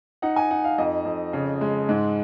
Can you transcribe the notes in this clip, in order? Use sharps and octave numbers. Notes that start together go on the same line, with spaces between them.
D#4 F#5
G#5
D#4 F#5
F5
F2 D#5
F2
C#3
G#3
G#2